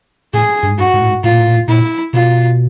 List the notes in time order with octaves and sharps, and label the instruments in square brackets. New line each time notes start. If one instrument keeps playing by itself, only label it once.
[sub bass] A2 [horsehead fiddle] G#4
[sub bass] G2
G#2
[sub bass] G2 [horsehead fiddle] F#4
[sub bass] G#2
A2
G#2
[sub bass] A2 [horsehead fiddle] F4
[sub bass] A#2
A2
A#2
A2
[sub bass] A#2 [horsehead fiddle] E4
[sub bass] B2 [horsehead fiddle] F4